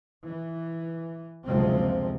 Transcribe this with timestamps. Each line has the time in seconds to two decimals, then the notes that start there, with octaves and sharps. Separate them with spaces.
0.24 E3
1.46 F#1 D2 C3 F3 G#3 C4